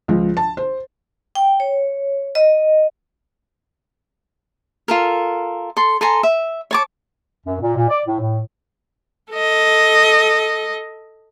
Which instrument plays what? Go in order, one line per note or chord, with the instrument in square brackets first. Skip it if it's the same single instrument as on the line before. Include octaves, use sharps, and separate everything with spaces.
[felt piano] C#2 F3
A5
C5
[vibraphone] G5
C#5
D#5
[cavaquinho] F4 A4 A#4
A4 C6
A4 G#5 A#5 C6
E5
C#5 A5 D6
[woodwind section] F#2
A#2
A#2
D5
A2
A2
[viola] A4 D#5